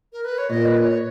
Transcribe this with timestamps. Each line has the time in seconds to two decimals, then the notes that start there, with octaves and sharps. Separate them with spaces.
0.13 A#4
0.25 B4
0.38 C#5
0.50 A#2 D#5
0.66 B4
0.77 D#5
0.82 C#5